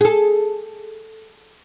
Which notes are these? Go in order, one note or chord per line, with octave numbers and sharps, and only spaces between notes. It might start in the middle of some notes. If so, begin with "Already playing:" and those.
G#4 A4